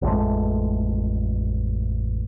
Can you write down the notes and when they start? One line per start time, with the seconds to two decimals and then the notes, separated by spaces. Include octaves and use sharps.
0.02 A1 F2 G#3 A3